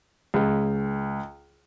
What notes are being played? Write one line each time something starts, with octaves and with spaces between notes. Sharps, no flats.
C#2